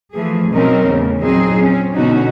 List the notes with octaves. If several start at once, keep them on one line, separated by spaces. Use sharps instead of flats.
E3 F3 A3 G#4
B2 F#3 C4 C#4 D#4 A#4
E2 A2 C#3
A#2 F#3 C4 D#4 G#4
C4 C#4
B2 D3 C#4 D#4 F#4